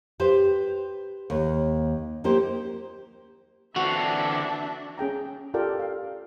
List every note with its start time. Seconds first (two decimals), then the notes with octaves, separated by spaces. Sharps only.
0.20 G4 B4 C5
1.30 D#2
2.24 A#3 D#4 G4 C5
3.76 D3 E3 C4 D4 F#4 E5
4.98 C#4 G#4 G5 A#5
5.54 F4 G4 A4 A#4 D5 G5
5.79 F5